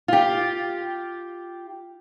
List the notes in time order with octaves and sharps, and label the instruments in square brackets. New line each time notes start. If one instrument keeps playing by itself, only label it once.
[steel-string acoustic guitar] F4 G4